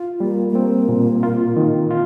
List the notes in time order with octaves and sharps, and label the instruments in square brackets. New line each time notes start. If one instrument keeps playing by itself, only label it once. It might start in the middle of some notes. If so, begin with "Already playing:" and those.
Already playing: [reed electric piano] F4
[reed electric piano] G3 [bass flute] A#3
[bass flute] A3
[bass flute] A#3 [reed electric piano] C4
[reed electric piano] A#2
F4
D#3
F4